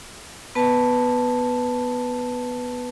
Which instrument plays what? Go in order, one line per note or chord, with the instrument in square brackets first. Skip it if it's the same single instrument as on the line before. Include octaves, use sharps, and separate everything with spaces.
[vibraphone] B3 B4 A5